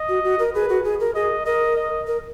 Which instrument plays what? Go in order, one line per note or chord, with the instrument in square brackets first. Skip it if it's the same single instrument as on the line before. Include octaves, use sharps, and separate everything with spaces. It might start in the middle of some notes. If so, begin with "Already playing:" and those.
Already playing: [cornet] D#5
[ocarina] F#4
F#4
A#4
[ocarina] G#4 [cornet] B4
[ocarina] F#4
G#4
A#4
[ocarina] G#4 [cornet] D#5
[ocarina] A#4 [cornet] D#5
[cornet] D#5
[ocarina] A#4